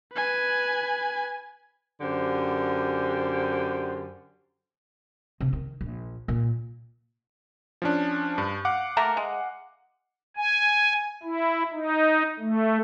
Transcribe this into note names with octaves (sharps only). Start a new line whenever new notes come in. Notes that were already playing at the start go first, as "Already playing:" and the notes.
B4 G#5
F#2 D3 G4 C5
C3
D#3
A#1
A#2
F3 C#4 D4
G2
F5 F#5 D6
A3 A#3 A#4
G#3
G#5
E4
D#4
A3